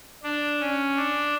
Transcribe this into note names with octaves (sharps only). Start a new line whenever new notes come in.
D4
C#4
D4